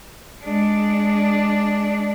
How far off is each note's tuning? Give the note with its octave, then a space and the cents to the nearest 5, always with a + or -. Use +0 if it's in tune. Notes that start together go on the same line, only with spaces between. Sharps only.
G#3 +0 D4 +0